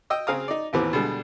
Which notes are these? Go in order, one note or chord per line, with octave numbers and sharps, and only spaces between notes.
D#5 G5 E6
C#3 C4 G#4 F5 A#5 D#6
D#4 D5
A1 D#2 E3 B3 C4 D6
B2 D3 G3 G#3